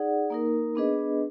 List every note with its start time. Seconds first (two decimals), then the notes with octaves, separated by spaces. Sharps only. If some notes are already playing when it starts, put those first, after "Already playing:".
Already playing: D#4 G#4 D5 F#5
0.30 A#3 D#4 A#4
0.75 B3 D4 G#4 B4 D#5